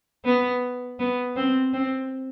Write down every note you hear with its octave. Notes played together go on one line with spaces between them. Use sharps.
B3
B3
C4
C4